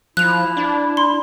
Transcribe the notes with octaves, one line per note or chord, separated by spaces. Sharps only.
F3 E4 F#6 F7
D4
C6